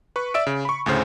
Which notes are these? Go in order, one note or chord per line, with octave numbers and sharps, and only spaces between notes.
B4 C#6
D5 E5 E6 D7
C#3
B5 C#6
D2 A2 C#3 C5